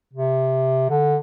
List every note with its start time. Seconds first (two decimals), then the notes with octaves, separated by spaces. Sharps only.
0.13 C3
0.90 D3